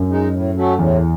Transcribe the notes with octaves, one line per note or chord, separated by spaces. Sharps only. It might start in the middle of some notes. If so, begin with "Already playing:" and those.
Already playing: F#2
G#3 D#4
A2
F#3 A3 C#4
E2 A2